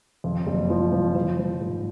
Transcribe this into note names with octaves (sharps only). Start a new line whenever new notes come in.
F2
F#1
F3
F3
F3
F3
G#2